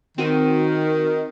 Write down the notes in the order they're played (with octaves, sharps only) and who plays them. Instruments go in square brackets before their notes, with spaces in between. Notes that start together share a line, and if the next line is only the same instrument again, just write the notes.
[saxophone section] D#3 [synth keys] C4 F#4 D#7